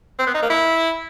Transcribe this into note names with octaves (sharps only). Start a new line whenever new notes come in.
C4
B3
D#4
A#3
E4